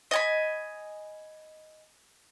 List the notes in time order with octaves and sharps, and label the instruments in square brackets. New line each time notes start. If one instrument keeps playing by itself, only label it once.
[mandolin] D#5 G#5 B5